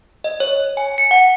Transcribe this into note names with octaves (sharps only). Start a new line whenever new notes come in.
D#5
C#5
G#5
C#7
F#5